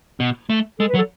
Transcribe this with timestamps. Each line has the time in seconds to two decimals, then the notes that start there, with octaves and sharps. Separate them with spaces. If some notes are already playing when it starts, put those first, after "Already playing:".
0.20 B2
0.50 A3
0.79 G#3 A4
0.88 B4
0.94 F#3
0.98 A4